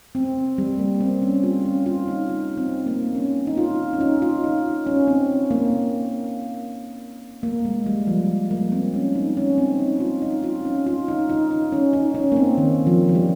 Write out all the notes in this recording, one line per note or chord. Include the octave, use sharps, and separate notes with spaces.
C4
G3
A#3
C4
C#4
F4
C#4
F4
D#4
D#4
C4
A#3
C#4
D#4
F4
C#4
D#4
F4
D#4
C#4
C4
A#3
A#3
G#3
G3
F3
A#3
C4
C#4
D#4
C#4
C4
D#4
F4
D#4
F4
C#4
F4
D#4
D#4
D#4
C#4
D#4
C#4
A#3
C4
D#3
F3
F3
G3